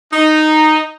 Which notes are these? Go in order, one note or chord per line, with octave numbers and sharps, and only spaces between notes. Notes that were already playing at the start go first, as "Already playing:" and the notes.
D#4